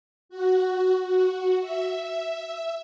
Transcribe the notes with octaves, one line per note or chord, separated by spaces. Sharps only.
F#4
F#4
E5